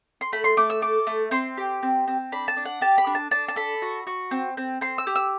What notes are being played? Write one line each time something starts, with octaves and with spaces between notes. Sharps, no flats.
C6
A3 B5
C6
A3 D6
E6
A4 D6
A3
C4 C6
G4
C4
C4
D4 B5
A5
D4
F#5
G4 A5
B5
D4
A5
D4 A5
A5
A4 B5
F#4
F#4
C4
C4
C4 C6
E6
G4
E6